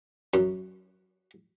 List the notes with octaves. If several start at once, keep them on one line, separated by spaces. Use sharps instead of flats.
F#2